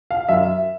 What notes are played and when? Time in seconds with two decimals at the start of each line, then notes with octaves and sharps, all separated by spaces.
0.11 F5
0.29 F#2 E5